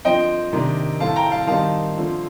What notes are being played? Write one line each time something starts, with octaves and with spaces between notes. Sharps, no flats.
D3 F3 C4 D#5 G5
C3 D#3 A#3 D4
A2 A3 C4 F5 A5
G5 A#5
F5 A5
D#3 G3 C4 D#4 F5 A5
D3 F3 A3 C4